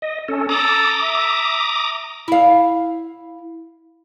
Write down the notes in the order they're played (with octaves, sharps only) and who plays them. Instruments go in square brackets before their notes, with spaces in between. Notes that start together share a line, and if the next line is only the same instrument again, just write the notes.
[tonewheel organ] D#5
C#4 A4
[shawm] A4 [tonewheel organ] A#5 D6 D#6
[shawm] E5
[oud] E4 F5